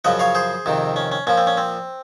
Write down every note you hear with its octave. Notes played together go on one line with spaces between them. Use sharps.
F#2 C#3 F3 D#5 F#5
C#5 F5
G#4 C5
F2 C3 D#3
C#4
C#4
A#2 F3 C#4
C4
C#4
C4